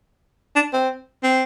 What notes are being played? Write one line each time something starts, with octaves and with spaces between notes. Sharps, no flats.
D4
C4
C4